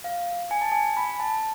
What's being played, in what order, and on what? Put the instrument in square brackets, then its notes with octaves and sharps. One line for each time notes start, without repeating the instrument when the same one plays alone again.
[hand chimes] F5
G#5
A5
G#5
B5
A5